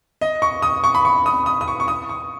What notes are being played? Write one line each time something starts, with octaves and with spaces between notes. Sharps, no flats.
D#5
C#6
D#6
C#6
B5
C#6
D#6
D#6
D#6
C#6
C#6
D#6
C#6